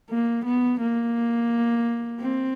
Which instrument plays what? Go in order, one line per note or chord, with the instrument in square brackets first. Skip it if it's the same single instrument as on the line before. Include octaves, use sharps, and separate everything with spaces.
[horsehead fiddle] A#3
B3
A#3
C4